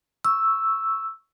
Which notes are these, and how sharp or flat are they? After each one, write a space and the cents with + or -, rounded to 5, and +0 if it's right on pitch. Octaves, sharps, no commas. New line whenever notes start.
C#6 +0 E6 +0